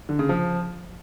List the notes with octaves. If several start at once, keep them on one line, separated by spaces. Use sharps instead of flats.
D3
C#3
F3